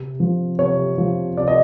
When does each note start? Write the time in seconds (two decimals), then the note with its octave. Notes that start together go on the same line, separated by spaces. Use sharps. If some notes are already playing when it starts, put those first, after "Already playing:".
Already playing: C3
0.20 F3
0.59 C3 C#5
0.98 F3
1.37 C3 D5
1.48 D#5